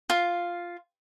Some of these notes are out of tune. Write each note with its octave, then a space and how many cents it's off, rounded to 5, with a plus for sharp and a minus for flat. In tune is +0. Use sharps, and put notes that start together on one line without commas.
F4 +0 F5 +0